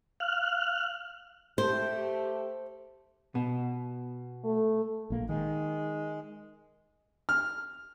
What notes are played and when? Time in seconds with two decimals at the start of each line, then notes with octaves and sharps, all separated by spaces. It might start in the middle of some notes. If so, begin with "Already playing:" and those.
0.20 F5 F6 F#6
1.58 A3 G4 C5
3.35 B2
4.44 A3
5.10 A#1 A#3
5.29 D#3 G#3
7.29 F6